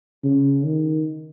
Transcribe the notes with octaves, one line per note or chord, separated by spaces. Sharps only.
C#3
D#3